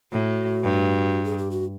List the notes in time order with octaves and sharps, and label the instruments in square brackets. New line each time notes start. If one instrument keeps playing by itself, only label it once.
[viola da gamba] A2 [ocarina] F#4
[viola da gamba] G2
[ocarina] G#4
G4
F#4